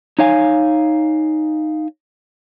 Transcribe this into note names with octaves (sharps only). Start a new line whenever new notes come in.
D#4 C#5 F5 G#5